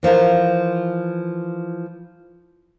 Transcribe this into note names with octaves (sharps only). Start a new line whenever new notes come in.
E3 F3 F4 A#4